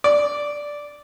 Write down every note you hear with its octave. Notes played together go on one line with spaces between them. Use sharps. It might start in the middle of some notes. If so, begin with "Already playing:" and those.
D5